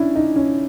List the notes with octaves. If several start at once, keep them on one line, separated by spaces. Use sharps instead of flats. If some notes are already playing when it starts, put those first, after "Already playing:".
Already playing: C#4 D4 E4
D#4
C#4